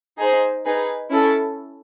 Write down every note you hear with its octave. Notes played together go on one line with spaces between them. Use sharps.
D#4 G#4 C5
D#4 G#4 B4
C#4 E4 A4